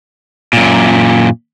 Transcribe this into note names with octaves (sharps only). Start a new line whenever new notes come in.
F#2 A#2